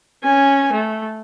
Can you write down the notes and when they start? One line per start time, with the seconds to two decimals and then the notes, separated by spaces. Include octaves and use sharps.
0.24 C#4 G#5
0.72 A3